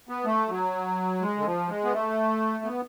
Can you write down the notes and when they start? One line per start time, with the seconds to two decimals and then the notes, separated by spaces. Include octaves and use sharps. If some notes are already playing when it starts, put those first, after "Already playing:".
0.09 B3
0.25 A3
0.49 F#3
1.21 G#3
1.38 D3
1.45 F3
1.69 G#3
1.84 B3
1.93 A3
2.64 B3